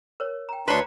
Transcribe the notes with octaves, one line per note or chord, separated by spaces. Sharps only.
A#4 C#5
G5 A#5
D2 D4 B4 C#5 A#5 C6